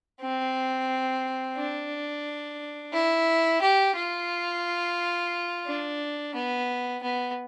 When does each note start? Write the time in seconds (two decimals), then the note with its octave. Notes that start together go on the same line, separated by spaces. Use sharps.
0.21 C4
1.57 D4
2.93 E4
3.61 G4
3.96 F4
5.66 D4
6.34 B3
7.03 B3